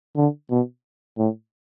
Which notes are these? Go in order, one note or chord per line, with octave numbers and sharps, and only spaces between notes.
D3
B2
A2